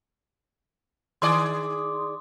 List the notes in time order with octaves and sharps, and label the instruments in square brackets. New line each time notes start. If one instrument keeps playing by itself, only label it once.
[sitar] D#3 G#4 D5 [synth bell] C6 D6 D#6